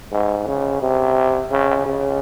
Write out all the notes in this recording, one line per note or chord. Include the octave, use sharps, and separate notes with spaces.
G#2
C#3
C3
C#3
C#3